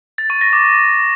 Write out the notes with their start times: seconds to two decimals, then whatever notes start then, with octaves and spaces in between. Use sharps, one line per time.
0.18 A6
0.30 C#6
0.41 A#6
0.53 D6